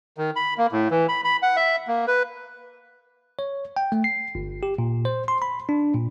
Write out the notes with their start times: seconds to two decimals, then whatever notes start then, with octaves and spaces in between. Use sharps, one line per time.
0.18 D#3
0.36 B5
0.58 A#3
0.72 A2
0.91 E3
1.09 B5
1.24 B5
1.42 F#5
1.56 E5
1.87 A#3
2.07 B4
3.39 C#5
3.76 G5
3.92 A3
4.04 C7
4.35 G1
4.63 G4
4.78 A#2
5.05 C5
5.28 C6
5.42 B5
5.69 D4
5.94 A#2